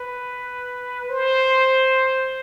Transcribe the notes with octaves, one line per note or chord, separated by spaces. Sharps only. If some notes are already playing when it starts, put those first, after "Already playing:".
Already playing: B4
C5